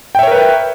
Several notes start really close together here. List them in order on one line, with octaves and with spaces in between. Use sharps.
G5 E5 C#5 A#4 B4